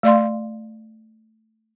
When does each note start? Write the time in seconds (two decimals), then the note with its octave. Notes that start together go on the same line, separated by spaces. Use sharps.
0.03 A3 D5 F5 C6